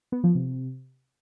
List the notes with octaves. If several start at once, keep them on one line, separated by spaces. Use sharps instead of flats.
B3
F3
C3